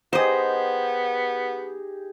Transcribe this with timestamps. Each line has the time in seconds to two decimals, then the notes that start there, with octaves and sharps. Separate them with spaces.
0.13 B3 D#4 G4 G#4 C5 D#5